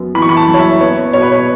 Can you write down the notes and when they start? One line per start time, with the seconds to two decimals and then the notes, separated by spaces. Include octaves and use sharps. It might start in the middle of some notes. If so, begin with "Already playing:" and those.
Already playing: F#2 B3
0.15 E3 B5
0.22 C#6
0.29 B5
0.37 A5
0.48 F#2
0.54 C#5
0.59 E5
0.81 B3 C#5
1.13 B2 C#5
1.22 B4
1.32 C#5